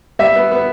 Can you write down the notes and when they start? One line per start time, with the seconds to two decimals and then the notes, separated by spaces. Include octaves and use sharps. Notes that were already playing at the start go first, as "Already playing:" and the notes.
0.19 G3 E5
0.36 B3
0.52 B3